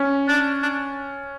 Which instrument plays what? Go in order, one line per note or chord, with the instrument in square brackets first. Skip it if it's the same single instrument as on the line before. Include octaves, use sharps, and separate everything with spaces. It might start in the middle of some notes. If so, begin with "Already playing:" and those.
Already playing: [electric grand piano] C#4
[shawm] D4
D4